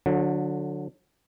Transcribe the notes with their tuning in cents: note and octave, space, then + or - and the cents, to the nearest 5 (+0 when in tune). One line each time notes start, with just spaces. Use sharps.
D3 +0 F#3 -30